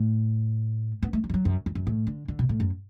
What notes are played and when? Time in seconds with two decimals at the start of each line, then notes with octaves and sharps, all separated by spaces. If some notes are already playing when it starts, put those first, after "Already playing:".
Already playing: A2
1.03 B3
1.13 A3
1.24 F#3
1.30 E3
1.34 F#3
1.45 F#2
1.66 E2
1.75 F#2
1.87 A2
2.07 D3
2.28 D3
2.39 B2
2.49 A2
2.60 F#2